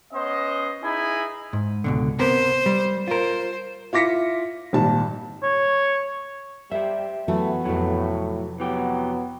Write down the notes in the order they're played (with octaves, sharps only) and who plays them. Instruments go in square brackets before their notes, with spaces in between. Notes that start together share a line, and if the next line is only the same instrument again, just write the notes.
[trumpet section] B3 C#4 C5 D#5
D#4 E4 G#4 G#5 B5
[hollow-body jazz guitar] G#2
C#2 B2 D3
[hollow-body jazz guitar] C3 B3 A#4 [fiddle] C5
[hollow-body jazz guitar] G3
[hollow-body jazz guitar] F4 A#4 [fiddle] C5
[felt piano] E4 F4 D6 A#6 B6 C#7
G#1 A#2 G3 A5
[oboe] C#5
[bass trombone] G3 [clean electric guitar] G4 E5 [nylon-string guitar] C5
[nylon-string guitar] E3 F#3 F#4 [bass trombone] A3 [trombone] B3
[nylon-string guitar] F2 C3 [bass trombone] A2 [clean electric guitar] F#3 A3
[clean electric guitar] E3 G4 [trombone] F#3 [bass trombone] B3